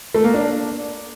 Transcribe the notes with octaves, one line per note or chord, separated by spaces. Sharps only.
A3
A#3
D4